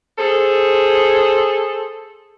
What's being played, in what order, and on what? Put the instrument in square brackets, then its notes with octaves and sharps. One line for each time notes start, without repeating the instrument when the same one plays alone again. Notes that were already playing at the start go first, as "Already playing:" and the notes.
[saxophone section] G#4 A4 C5